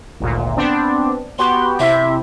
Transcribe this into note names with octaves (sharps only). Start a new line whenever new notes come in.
G#1 D2 A#2
B3 C4 D4
B3 F#4 G4 C6
C3 C4 E4 E5